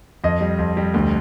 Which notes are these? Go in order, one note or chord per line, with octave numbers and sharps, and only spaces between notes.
F2 D#5
G3
F2
G3
D2